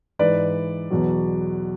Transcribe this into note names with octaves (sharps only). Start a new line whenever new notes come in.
G#2 E3 B4 D5
E2 B2 F#3